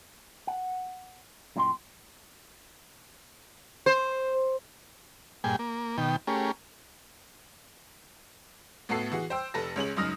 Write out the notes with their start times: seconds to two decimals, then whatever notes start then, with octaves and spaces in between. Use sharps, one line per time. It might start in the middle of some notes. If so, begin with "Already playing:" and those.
0.47 F#5
1.56 F#2 A#2 D#4 G4 G5 C6
3.86 C5
5.44 G2 A#2 G#4 G5 G#5
5.59 A#3
5.98 B2 D#3 G5
6.27 A3 C#4 G4 G#4 A#4
8.89 A2 B3 F#4 A4 C7
9.12 E3 F#4 G#4
9.30 C5 G5 E6
9.54 F1 A4 B4 A#6
9.76 C#2 C#4 G#4 F#7
9.96 C#2 F#2 D#4 D#6 F6 A#6